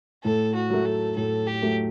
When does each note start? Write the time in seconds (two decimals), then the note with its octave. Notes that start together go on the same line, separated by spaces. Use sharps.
0.24 A2 A4
0.55 F#4
0.70 F#3 A3
0.85 A4
1.16 A2 A4
1.47 G4
1.62 F#3 A3